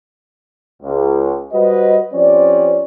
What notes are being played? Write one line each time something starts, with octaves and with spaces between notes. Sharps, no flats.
C#2
G3 F#4 B4 C5 D#5
F3 C4 C#4 G4 C5 D5